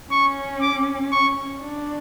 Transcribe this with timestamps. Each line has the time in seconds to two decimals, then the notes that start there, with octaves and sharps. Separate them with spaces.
0.11 C#4 C#6
0.61 D6
1.12 C#6
1.63 D4